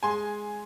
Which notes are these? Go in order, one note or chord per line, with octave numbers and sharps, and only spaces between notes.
G#3 G#5 C6